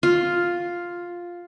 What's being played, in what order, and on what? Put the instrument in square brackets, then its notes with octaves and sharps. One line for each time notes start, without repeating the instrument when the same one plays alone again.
[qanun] F4